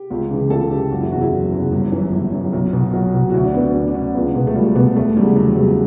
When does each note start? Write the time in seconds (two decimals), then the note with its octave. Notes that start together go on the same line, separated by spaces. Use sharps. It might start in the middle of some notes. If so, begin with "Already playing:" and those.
Already playing: G4
0.11 C#2
0.30 C#3 E3
0.50 C#2 A4
0.71 C#3 E3 G4
0.91 F#1 F#4
1.00 E4
1.11 E2 C#3 E3 F#4
1.21 E4
1.32 F#1
1.52 E2 C#3 E3
1.72 G1
1.92 F#2 E3
2.12 G1
2.33 F#2 E3
2.53 B1
2.73 B2
2.93 B1 F#4
3.14 B2 F#4
3.30 F#4
3.33 D2 E4
3.44 D4
3.54 D3 B3
3.65 B3
3.75 D2 D4
3.88 D4
3.94 D3 C#4
4.15 C#2 B3
4.35 B2 B3
4.47 A3
4.55 C#2 G3
4.75 B2 B3
4.96 E1 A3
5.16 E2 C#3 E3 G3
5.36 E1 F#3
5.57 E2 C#3 E3 G3